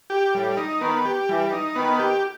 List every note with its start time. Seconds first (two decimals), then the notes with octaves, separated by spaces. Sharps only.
0.10 G4
0.34 A2 G3
0.57 D#4
0.81 D#3 B3
1.05 G4
1.29 E3 G3
1.52 D#4
1.76 D#3 B3
1.99 G4